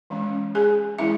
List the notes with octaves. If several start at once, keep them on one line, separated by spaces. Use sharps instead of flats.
E3 G#3 C#4
G#4 G#5
E3 G#3 C#4 E4 E5